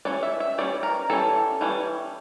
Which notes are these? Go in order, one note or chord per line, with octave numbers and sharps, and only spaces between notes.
E3 G3 C#4 D5
E5
E5
E3 G3 C#4 D5
A#4
E3 G3 C#4 A4
E3 G3 C#4